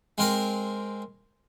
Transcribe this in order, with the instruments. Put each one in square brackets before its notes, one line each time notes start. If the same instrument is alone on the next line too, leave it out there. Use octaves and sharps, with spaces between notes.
[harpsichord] G#3 C4 A#4 A#5